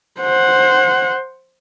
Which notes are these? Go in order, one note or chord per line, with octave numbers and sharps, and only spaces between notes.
C5 F#5